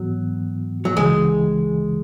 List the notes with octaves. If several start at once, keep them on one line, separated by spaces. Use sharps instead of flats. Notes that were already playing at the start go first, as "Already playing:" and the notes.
Already playing: G#2 E3 F#3 B3
F#3
C#2 C#3 E3 G#3